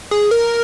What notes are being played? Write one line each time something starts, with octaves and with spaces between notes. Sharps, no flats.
G#4
A#4